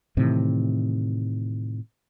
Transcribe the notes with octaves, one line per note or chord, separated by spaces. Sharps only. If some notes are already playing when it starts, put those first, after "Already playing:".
A2 C3 D#3 E3